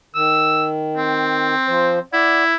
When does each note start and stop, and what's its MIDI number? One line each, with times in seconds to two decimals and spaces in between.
0.15 1.54 51
0.15 0.66 88
0.97 2.01 60
1.68 1.99 53
1.68 1.99 72
2.14 2.56 64
2.14 2.43 74
2.14 2.43 78